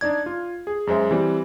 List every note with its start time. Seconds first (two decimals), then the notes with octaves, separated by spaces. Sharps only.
0.01 D4 D#4 D5 G#6
0.26 F4
0.67 G#4
0.87 F#2 G#3 C5 E5
1.11 E3 G3 C4